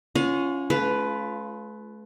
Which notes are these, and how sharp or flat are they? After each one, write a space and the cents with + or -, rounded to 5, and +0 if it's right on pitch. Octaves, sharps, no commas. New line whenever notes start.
C#4 +5 F4 -20 F#5 -45
A3 -45 F4 +0 B4 +10